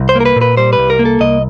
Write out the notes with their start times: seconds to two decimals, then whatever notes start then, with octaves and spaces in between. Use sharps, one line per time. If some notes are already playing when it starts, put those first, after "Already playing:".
Already playing: C2
0.09 C5
0.16 A#3 A#4
0.26 B4
0.36 A#2
0.41 B4
0.57 G3 C5
0.73 B4
0.79 C2
0.90 A#4
0.99 A#3
1.05 A4
1.20 C2 D#5